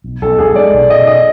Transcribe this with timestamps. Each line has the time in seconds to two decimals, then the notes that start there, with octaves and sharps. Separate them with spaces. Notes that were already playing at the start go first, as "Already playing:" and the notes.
0.04 B1
0.22 B1 A4
0.39 B1 G#4
0.55 G#3 D5
0.73 B1
0.90 B2 D#5
1.07 B2 D#5